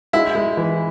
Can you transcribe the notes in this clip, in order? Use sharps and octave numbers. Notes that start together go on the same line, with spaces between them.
G#3 E4
G#3
E3